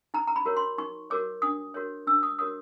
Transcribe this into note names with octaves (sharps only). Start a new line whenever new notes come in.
D#4 A#5
A#5
B5
F#4 A#4 C#5
C6
D#4 C#6
F#4 A#4 C#5 D6
D4 D#6
F#4 A#4 C#5
D4 E6
D#6
F#4 A#4 C#5 D#6